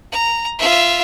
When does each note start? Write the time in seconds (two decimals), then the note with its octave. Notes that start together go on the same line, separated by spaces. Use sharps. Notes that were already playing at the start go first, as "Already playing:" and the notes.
0.12 A#5
0.59 F4 E5